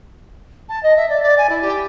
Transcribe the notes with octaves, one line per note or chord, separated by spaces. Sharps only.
A5
D#5
E5
D5
D5
G#5
E4
G4